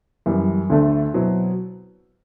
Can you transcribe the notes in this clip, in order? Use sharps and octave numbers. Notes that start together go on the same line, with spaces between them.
F#2 E3 G3
D2 D3 A3 D4 A4
B2 F#3 C4 E4